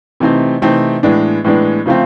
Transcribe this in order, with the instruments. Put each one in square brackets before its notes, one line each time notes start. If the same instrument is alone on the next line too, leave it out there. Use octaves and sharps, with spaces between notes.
[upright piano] C3 E3 A3 C4 D#4
C3 E3 A3 C4 D#4
A2 E3 G#3 B3 D4
A2 E3 G#3 B3 D4
C#3 F3 A3 C4 F4